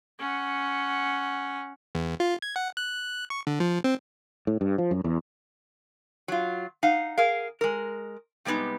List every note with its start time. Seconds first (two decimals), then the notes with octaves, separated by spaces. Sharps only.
0.19 C#4 F#5
1.95 E2
2.20 F4
2.42 G#6
2.56 F#5
2.77 F#6
3.30 C#6
3.47 D3
3.60 F3
3.84 C4
4.47 A2
4.61 G2
4.78 F3
4.91 F#2
5.04 E2
6.28 F#3 F4
6.83 D#4 F5 F#5
7.18 G#4 A#4 F5
7.61 G#3 A#4
8.45 C3 G3 G#3 B3 D#4